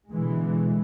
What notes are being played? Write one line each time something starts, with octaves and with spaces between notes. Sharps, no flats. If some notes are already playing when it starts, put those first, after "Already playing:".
B2 D3 E3 G#3